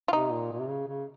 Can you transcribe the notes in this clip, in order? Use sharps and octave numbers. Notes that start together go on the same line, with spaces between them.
F4
C3 D#4
A#2
A#2
C3
C#3
C#3